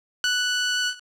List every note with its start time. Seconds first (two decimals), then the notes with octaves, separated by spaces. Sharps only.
0.24 F#6